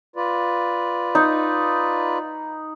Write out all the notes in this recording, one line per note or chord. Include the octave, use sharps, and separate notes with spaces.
F4 B4 D5
D#4